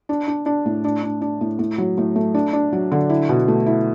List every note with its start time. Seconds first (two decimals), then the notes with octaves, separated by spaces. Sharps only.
0.09 D4
0.28 D4
0.46 D4
0.66 A2
0.85 D4
1.03 D4
1.21 D4
1.41 A2
1.59 A2
1.78 F#3
1.98 A2
2.16 A3
2.34 D4
2.53 D4
2.73 F#3
2.92 D3
3.09 E4
3.29 B2
3.48 A3
3.66 E4